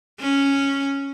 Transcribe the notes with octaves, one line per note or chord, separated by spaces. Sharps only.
C#4